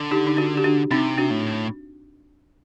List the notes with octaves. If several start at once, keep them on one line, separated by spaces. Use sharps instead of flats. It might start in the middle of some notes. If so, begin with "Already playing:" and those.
Already playing: D3
D#4 G4
D#4
D4 F#4
G4
D4 F#4
C3 C4 D#4
D4 F#4
A2